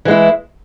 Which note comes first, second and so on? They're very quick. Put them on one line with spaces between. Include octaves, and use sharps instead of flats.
E3 G#3 E4